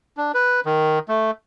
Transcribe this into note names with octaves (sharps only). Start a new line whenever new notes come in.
D4
B4
D#3
A3